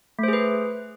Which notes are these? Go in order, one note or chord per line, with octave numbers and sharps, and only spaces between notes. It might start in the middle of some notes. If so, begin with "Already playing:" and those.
A3 G#4 B4 C5